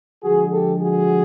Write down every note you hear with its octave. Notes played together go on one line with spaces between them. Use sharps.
D3 F3 G#3 F#4 G#4
G4 A4
F#4 G#4